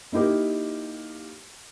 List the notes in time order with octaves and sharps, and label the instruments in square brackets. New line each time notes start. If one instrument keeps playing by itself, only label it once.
[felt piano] A#3 D#4 E4 G4 A#4